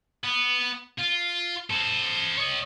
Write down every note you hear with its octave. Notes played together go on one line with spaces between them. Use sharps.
B3
F4
A4 C5
C#5 D#5